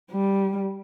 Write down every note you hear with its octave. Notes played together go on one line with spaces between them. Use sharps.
G3